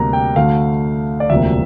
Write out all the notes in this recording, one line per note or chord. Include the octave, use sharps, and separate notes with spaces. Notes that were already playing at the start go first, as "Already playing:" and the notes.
Already playing: D2 C3 G3 A#3 A#5
G5
D2 D3 A3 F5
D5
E1 D2 C3 F3 A#3 E5